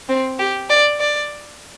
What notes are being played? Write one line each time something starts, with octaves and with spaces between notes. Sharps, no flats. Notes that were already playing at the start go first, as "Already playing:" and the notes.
C4
G4
D5
D5